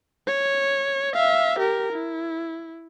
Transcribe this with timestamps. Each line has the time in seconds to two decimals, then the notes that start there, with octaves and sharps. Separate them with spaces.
0.27 C#5
1.14 E5 F5
1.59 G4 A#4
1.93 E4